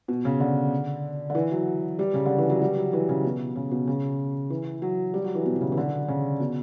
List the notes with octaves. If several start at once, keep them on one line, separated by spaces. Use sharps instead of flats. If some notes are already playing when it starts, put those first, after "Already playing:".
B2
C#3
D3
D3
E3
F#3
G3
C#3
D3
E3
F#3
G3
F#3
E3
C#3
B2
C#3
B2
C#3
E3
F#3
G3
F#3
E3
B2
B2
C#3
E3
D3
C#3
B2